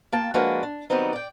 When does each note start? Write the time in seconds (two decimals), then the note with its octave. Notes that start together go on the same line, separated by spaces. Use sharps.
0.12 A#3 F4 G5 A5
0.34 F3 G#3 A#3 D4 F#4 B4
0.63 D4
0.90 D#3 F#3 G3 B3 C4 D#4
1.13 D5 G5